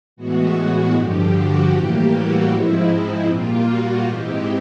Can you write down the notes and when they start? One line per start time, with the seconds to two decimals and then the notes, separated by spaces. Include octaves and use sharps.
0.16 A2 E3 G#3 B3 F#4
0.94 G2 D3 F3 G4
1.32 F#4
1.71 A2 E3 G3 A#3 G4
2.10 F#4
2.48 G#2 F3 G#3 C4 E4
2.87 E4
3.26 A#2 G3 A#3 F4
3.64 F#4
4.03 G#2 E3 G#3 C4 G4